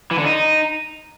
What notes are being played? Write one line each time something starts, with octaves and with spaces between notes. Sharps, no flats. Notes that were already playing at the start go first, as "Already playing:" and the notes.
E3
D3
D#4